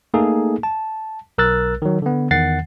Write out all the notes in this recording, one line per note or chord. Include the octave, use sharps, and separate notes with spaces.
A3 A#3 D#4 G#4 A4
A5
B1 A#4 E6 F#6 A6
D#3 F#3
D3 B3
E2 D#3 F#5 A6 C7